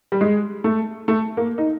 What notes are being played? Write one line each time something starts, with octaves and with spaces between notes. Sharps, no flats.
G3
G#3
A3
A3
A#3
D#4